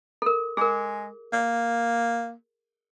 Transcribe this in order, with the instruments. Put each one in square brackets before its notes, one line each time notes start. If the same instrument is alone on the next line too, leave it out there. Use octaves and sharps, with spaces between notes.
[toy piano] A4 A#4
[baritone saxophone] G#3 [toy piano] G#4 A#4
[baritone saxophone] A#3